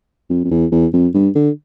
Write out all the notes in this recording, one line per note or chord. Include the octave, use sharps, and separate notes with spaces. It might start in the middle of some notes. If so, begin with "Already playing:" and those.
F2
F2
E2
E2
F2
G2
D3